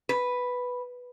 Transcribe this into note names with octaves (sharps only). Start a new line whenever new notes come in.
B4